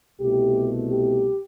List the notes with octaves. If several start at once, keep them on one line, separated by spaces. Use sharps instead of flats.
C2 B2 A3 G4
G4